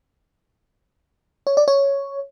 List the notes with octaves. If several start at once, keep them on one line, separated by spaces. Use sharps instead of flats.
C#5
D5
C#5